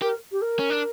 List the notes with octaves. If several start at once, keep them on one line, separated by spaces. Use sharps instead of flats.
G4 A#4
G4
A#4
C#4
D4